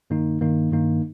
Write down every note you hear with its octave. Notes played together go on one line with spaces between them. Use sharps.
G2 D#3 A#3 D#4
G2 D#3 A#3 D#4
G2 D#3 A#3 D#4